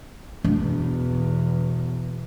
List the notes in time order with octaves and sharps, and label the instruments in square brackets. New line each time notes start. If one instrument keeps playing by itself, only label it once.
[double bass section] E2 B2 [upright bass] D4